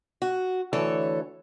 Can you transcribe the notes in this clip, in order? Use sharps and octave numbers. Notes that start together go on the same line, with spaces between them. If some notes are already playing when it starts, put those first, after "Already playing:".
F#4
D2 E3 A4 C#5